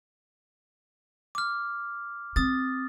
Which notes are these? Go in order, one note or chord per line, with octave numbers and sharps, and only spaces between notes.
D6 F6
C4 D#6 A6